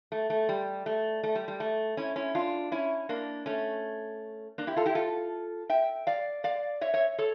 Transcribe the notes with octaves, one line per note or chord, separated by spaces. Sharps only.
A3
A3
G3
A3
A3
G3
G3
A3
C#4 E4
C#4 E4
D4 F4
C#4 E4
A#3 D4
A3 C#4
A#3 D4
E4 G4
F4 A4
E4 G4
F4 A4
E5 G5
D5 F5
D5 F5
C#5 E5
C#5 E5
A4 C#5